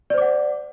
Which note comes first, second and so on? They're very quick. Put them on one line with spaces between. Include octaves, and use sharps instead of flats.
D5 C5 D6 F#5